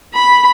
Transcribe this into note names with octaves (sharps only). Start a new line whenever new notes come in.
B5